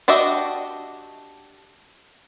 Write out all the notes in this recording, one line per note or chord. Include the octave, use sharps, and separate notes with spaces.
D4 F#4 G4 D#5 E5